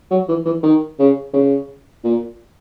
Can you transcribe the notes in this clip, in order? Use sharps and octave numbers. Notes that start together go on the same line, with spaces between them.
F#3
E3
E3
D#3
C#3
C#3
A#2